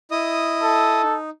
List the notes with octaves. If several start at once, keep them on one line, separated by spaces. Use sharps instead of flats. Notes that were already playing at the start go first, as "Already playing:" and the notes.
E4 D#5 D#6
A4
D#4